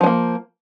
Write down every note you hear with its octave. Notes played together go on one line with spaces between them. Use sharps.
F3 G#3 A#3